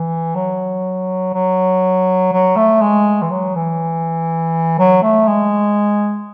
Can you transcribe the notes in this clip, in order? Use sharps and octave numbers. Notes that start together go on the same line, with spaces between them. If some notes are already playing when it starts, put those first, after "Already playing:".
Already playing: E3
F#3
F#3
F#3
A3
G#3
E3
F#3
E3
F#3
A3
G#3